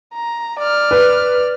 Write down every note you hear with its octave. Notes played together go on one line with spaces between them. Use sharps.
A#5
D5 F6
B4